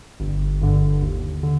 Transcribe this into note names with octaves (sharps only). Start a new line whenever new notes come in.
G1
G2 D3
D#2
D3